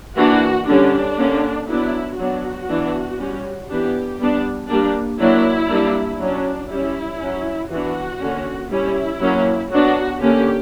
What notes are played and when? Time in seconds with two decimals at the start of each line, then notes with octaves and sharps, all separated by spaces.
0.17 E3 A#3 D4 F#4
0.67 D3 G3 C#4 D4
1.18 D3 A#3 C#4
1.69 F#3 B3 D4 E4
2.18 F#3 B3 D4 F#4
2.68 E3 B3 D4
3.19 G3 C#4
3.69 E3 B3 D4 G4
4.19 G3 B3 D4
4.69 G3 A#3 D4
5.20 F#3 A#3 D4 E4
5.70 G3 A#3 D4
6.19 F#3 C#4 D4
6.70 G3 C#4 E4
7.20 F#3 C#4
7.70 E3 B3 D4 F#4
8.21 D3 A#3 C#4
8.70 G3 C#4 E4
9.21 F#3 A#3 C#4
9.71 F#3 B3 D4 F#4
10.21 D3 A#3 C#4 G4